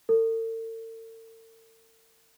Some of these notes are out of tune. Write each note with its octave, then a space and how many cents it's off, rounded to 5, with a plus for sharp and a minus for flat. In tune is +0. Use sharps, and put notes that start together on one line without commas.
A4 +45